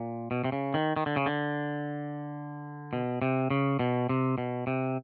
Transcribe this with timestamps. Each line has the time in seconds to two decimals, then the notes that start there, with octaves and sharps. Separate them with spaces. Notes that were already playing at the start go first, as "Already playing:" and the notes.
Already playing: A#2
0.31 B2
0.44 C3
0.52 C#3
0.74 D#3
0.96 D#3
1.06 D3
1.16 C#3
1.26 D3
2.93 B2
3.22 C3
3.50 C#3
3.79 B2
4.09 C3
4.38 B2
4.67 C3